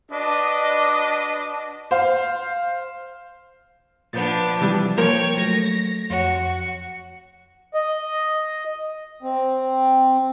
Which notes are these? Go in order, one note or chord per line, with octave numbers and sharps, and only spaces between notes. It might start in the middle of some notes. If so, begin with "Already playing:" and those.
D4 F#4 B4 D#5
C5 F5
A#2 F3 B3 D4 B5 G6 A6
C3 E3 G3
F3 A#3 A#4 C5 C#5 G5 G#6
F#3 A3 A#6
F2 F#4 C#5
D#5
C4